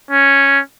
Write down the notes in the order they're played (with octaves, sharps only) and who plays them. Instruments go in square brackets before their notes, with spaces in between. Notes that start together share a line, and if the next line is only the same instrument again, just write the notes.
[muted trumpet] C#4